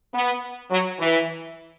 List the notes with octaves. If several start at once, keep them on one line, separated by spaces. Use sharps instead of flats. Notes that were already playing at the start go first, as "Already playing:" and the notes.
B3
F#3
E3